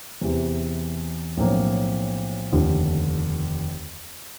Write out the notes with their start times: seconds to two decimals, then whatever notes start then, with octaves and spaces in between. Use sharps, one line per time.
0.21 E2 C3 E3
1.37 B1 A2 F3 A#3 C#4
2.53 F1 D#2 D3